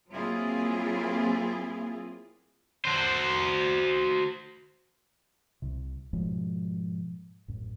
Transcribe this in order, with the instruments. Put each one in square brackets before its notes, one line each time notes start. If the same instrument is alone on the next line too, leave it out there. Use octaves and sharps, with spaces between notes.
[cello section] F#3 A#3 C4 E4 F4 G#4
[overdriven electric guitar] F#4 C5
[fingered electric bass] C2 C3
G#2 B2 F3 G#3
A1 F#2